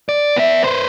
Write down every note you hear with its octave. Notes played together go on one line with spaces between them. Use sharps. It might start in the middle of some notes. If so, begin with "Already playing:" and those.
D5
B3 E5
B4 C5